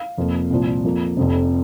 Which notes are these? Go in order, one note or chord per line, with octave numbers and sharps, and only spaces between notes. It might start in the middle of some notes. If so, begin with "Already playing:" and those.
Already playing: F5
F1 F2 F3 A#3
C2 A#2 F3
F2 F3 A#3
F1 F2 C3